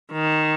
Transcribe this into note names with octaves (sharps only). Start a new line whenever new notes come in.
D#3